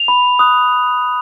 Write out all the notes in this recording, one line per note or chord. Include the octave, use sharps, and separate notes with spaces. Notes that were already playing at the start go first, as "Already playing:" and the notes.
Already playing: F7
B5
D#6 F#6